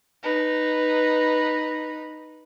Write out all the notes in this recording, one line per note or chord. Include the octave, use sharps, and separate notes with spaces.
D#4 B4